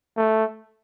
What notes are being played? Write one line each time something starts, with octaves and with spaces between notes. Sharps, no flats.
A3